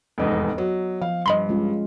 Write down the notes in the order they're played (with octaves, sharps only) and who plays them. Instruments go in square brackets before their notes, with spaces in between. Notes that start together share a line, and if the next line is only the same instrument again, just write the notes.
[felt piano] F1 E2 G#2 [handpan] B3 D#5
[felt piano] F#3
[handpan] F3 [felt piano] F5
[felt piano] G2 [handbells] D#5 B5 C6
[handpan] G#3 C#4 F4